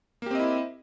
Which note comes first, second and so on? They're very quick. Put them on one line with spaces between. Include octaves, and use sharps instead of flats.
A#3 G4 C4 D#5 E4